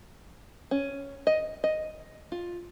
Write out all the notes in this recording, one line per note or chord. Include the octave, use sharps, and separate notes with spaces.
C#4
D#5
D#5
F4